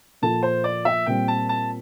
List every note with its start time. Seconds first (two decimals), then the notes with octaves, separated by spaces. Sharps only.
0.22 A#2 F3 A#3 F4 A4 A5
0.43 C5
0.64 D5
0.85 E5
1.06 A#2 G3 C4 G5
1.28 A5
1.49 A5